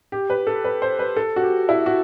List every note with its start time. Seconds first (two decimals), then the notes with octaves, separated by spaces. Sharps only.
0.12 G4
0.30 B4
0.47 A4
0.64 B4
0.82 C5
0.99 B4
1.17 A4
1.36 F#4
1.42 G4
1.69 E4
1.86 F#4